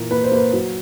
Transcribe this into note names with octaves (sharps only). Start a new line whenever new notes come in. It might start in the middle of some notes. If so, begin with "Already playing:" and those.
Already playing: A#2 E3 A#3
A#3 B4
C5
A#3 B4
F#3